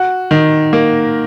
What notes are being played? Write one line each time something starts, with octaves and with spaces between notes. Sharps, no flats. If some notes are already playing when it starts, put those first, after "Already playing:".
Already playing: F#4
D#3
A#3